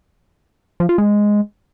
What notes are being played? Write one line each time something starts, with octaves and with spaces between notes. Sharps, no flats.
F3
F4
G#3